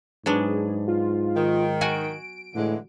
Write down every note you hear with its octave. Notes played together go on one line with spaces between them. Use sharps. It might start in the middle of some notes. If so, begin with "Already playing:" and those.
G#2 F#3 B3 D4 G#4
F4
D#3
F#4 F#5 G#5 D7
A2 D3 E3 G#3